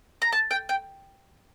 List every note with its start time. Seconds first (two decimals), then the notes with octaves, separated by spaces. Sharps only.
0.22 A#5
0.32 A5
0.51 G5
0.69 G5